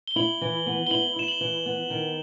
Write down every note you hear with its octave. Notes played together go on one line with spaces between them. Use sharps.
G7
E4 F#7
E3
B3
G7
E4 F#7
E4 E7
F#7
E3
B3
D#3